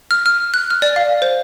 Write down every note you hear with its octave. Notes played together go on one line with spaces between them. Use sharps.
F6
F6
F#6
F6
D5
F5
C5